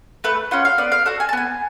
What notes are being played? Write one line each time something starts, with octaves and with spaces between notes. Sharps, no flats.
A3 B4
C#4 F4 F#5
F5
B3 D5
F5
F#4 A4 F#5
G#5
A5
B3 G#5